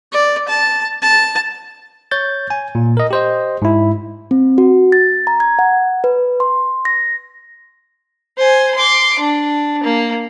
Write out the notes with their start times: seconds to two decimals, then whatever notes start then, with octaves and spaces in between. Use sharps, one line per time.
0.12 D5
0.48 A5
1.02 A5
2.11 C#5 G6 A6
2.50 G#5
2.75 A#2
2.97 A#4 D#5
3.11 G4 C5 D#5
3.62 G#2 E4
4.31 C4
4.58 F#4
4.92 A6
5.27 A#5
5.40 G#6
5.59 F#5
6.04 B4
6.40 C6
6.85 A#6
8.38 C5 G#5
8.75 C6 D6
9.19 D4
9.83 A#3